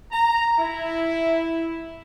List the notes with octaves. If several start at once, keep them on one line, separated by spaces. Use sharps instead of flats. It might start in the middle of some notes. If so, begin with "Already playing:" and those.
A#5
E4